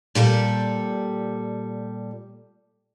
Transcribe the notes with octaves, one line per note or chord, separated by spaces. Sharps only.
A#2 G3 G4 A4